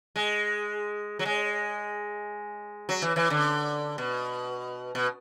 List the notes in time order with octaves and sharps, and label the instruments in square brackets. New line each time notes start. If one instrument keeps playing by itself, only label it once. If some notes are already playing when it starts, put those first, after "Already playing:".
[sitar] G#3
F#3
G#3
F#3
E3
E3
D3
B2
B2